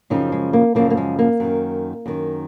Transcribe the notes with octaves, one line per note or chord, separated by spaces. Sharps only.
F#2 C#3 F3 C4 D#4
G#3
A#3
F#2 C#3 F3 A#3
A#3
G#3
A#3
F#2 D#3
F#2 D#3